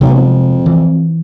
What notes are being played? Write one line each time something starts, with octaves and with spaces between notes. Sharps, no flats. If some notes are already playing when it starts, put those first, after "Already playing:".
B1 C3 F#3 G#3
F2
E3